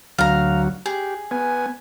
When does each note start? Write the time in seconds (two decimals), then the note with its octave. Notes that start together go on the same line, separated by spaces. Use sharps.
0.18 D2 F#3 F5 A#5
0.86 G4 G#4
1.31 B3 G#5